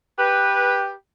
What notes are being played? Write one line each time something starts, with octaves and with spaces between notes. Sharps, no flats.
G4 B4